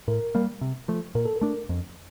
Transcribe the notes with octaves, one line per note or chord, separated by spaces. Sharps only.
A2 A#4
G3 A#3
C3
F3 A3
A#2 A#4
A4
A#4
A3 D4
F2